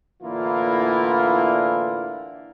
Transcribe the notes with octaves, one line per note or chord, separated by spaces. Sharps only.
A2 D3 E3 A#3 E4 F4